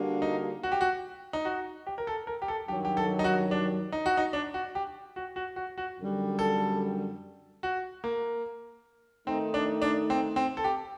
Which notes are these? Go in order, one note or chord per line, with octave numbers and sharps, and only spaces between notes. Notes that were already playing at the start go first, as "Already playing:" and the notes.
Already playing: D3 G3 A#3 D4 F#4
D#4
F#4
G4
F#4
D#4
F#4
G4
A#4
A4
A#4
G4
A4
G2 D#3 F#3 G4
G4
A4
D#4
F#4
D4
D#4
F#4
D#4
D4
F#4
G4
F#4
F#4
F#4
F#4
F#2 D3 G3
A4
F#4
A#3
D#3 A3 C4 D#4
D4
D4
C4
C4
A4
G4